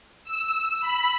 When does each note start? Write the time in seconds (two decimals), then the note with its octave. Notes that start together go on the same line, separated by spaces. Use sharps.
0.24 E6
0.80 B5